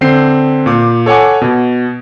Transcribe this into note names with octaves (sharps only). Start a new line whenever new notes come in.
D3 C4 G6 C7
A#2 D6
A4 C#5 F#5 G#5 D6
B2